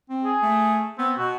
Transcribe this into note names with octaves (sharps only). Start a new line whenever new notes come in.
C4
G#4
A3
B3 C4
B2 F#4